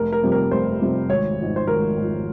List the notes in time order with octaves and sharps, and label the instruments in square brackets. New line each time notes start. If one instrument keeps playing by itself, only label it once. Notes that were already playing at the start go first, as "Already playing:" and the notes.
Already playing: [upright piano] F1 A#4
A#4
F2 C3 G3
A#4
F1 C5
F2 C3 G3
G#1 C#5
G#2 F3
C5
G#1 A#4
G#2 F3